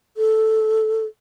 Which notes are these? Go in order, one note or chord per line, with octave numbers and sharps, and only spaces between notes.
A4